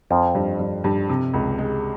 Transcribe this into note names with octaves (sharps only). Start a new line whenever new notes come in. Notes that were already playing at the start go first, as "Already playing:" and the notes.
F2 F3 C4
G2
G2
G2
C3
C#2
G#3